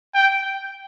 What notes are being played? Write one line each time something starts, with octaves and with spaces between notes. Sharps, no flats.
G5